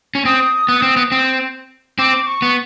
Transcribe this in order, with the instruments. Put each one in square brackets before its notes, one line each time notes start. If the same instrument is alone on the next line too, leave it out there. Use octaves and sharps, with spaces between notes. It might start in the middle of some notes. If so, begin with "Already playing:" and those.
[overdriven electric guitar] C#4
[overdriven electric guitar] C4 [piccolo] D#6
[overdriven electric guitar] B3
C4
B3
C4
[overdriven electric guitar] C4 [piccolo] D6
[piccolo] C#6
[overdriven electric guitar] B3